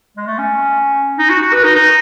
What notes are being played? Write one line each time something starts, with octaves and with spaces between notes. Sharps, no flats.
G#3
A3
C#4
D#4
F#4
F#4
B4
D#4
D#4